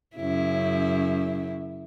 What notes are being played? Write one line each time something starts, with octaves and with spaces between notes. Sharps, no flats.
F#2 C#3 E4